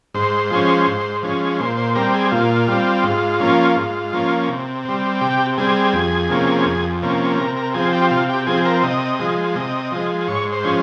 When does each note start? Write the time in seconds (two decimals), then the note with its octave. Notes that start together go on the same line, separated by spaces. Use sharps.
0.14 G#2 C5
0.51 F3 G#3 C#4
0.87 G#2
1.23 F3 G#3 C#4
1.60 A#2 C5
1.77 C5
1.95 G3 C4 A#4
2.14 G#4
2.31 A#2 F4
2.68 G3 C4
3.04 G#2
3.40 F3 A#3 C#4
3.76 G#2
4.13 F3 A#3 C#4
4.49 C3
4.85 G3 C4
5.21 C3 G4
5.58 G3 C4 G#4
5.93 F2
6.30 C3 F3 A#3 C#4
6.66 F2
7.02 C3 F3 A#3 C#4
7.38 C3 A#4
7.56 A#4
7.74 F3 C4 G#4
7.93 G4
8.11 C3 F4
8.29 G4
8.47 F3 C4 G#4
8.65 A#4
8.83 C3 D#5
9.19 F3 G#3
9.55 C3 D#5
9.92 F3 G#3
10.28 G#2 C#5
10.52 C5
10.64 F3 G#3 C#4